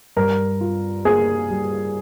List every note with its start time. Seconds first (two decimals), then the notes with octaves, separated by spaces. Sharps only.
0.17 G2 A#4
0.61 F4
1.05 A#3 G#4
1.50 G3